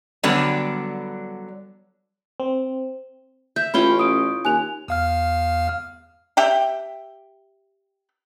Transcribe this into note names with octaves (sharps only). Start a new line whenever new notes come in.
D3 F#3 G3 B3 D4
C4
E5 G6
A1 C#4 F4 G5 B5
D#6 D7
D#2 G#5 F#6 F7
E2 F5 F6
G4 E5 G5